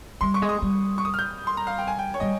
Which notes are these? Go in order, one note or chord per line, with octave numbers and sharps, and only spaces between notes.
G3 C6
C#6
G#3
D#6
G3
C#6
D#6
F6
G6
C6
A#5
F5
G5
G#5
G5
C#5
G3 D#5